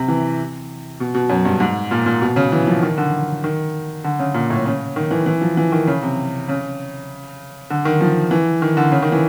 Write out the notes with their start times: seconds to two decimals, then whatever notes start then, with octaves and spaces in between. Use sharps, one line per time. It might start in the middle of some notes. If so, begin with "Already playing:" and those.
Already playing: C3
0.08 E3
1.00 B2
1.14 B2
1.30 F#2
1.45 G2
1.60 G#2
1.91 A#2
2.06 A#2
2.21 B2
2.36 C#3
2.52 E3
2.67 F3
2.83 D#3
2.98 D3
3.44 D#3
4.04 D3
4.19 C#3
4.34 A#2
4.50 A2
4.65 C#3
4.96 D#3
5.11 E3
5.26 E3
5.41 F3
5.57 E3
5.72 D#3
5.87 C#3
6.03 C3
6.49 C#3
7.70 D3
7.85 D#3
8.01 F3
8.31 E3
8.62 D#3
8.77 D3
8.92 C#3
9.02 D#3
9.12 E3